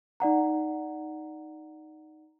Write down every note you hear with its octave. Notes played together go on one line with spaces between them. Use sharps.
D#4 D5 F#5 A#5